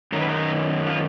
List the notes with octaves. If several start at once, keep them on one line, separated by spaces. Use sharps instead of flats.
F#2 D#3 F#3 A#4
B4
A#4
F4